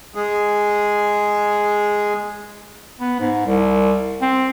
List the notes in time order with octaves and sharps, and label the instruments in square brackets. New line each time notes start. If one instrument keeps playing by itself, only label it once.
[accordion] G#3 G#4
[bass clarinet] B3
G#2
C2
C4